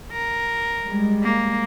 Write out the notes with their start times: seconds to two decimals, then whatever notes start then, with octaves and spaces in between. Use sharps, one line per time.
0.12 A#4
0.85 G3 G#3
1.23 A#3